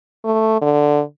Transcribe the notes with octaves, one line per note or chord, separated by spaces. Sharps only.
A3
D3